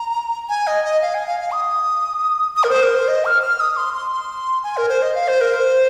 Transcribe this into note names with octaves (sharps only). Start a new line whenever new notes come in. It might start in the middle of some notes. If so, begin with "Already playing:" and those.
Already playing: A#5
G#5
D#5
D#5
F5
G#5
F5
F5
D#6
D#6
A#4
C5
A#4
C5
D#5
F6
F6
D#6
C6
C6
C6
G#5
A#4
C5
D#5
F5
C5
A#4
C5